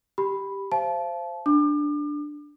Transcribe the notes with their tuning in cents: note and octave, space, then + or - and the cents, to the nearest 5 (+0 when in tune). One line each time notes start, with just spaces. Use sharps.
G4 +0 B5 +0
C5 +0 F5 -35 A5 -25
D4 +0 D6 +35